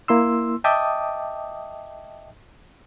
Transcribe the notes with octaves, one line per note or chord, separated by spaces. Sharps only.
A#3 E4 C6 E6
D#5 E5 G5 A5 D6 D#6